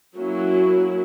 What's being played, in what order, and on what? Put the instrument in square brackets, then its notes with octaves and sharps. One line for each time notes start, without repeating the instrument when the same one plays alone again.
[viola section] F#3 A#3 C#4 E4